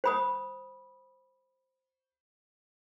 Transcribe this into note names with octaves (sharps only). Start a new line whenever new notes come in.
C5 B5 D#6